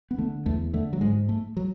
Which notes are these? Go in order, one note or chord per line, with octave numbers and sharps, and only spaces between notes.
B3
D3 A3
E2 A3
D3 A3
F#3
G#2 G#3
A3
F#3